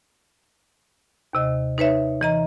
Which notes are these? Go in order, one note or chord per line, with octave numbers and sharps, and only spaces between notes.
D#2 C3 D#5
D#4 B4 C#5 E5
E3 D#5 A#5